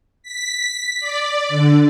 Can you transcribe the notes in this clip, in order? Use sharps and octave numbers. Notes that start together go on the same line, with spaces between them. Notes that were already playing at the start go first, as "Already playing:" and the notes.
B6
D5
D3